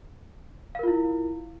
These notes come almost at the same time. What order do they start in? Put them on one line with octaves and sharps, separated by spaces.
F5 A#4 F4 E4